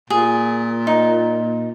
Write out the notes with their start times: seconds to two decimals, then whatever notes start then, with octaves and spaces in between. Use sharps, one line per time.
0.10 A#2 G#4
0.87 D#4